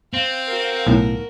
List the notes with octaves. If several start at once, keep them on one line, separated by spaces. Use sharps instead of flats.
C4 F5
F#4 A#4
B1 A2